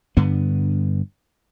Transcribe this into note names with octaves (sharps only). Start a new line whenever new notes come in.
G2 D3 B3